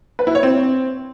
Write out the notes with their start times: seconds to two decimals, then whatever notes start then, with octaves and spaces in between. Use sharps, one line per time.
0.19 B4
0.27 E4
0.35 C#5
0.43 C4